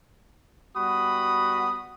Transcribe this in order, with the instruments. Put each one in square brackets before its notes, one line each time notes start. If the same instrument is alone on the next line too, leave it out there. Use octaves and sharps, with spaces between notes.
[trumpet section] G3 B3 F#4 B5 D#6